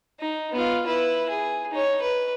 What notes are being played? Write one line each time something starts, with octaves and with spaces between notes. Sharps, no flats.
D#4
B3 F4
E4 B4
G#4
D#4 C#5
B4